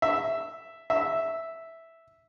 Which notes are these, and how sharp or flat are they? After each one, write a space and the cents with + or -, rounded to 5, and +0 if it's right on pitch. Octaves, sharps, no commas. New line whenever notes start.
E5 +0
E5 -5